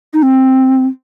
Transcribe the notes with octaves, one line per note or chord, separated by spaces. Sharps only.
D#4
C4